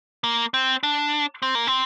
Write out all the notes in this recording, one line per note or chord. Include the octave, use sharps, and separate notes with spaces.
A#3
C4
D4
C4
A#3
C4